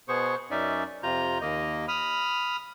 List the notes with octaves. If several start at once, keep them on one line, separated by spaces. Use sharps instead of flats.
B2 B3 G#4 C5 C#6
F#2 C#4 D#4 D5 E5
F2 C3 F4 A#5 G6
D#2 A#3 D#5
B5 D#6 F6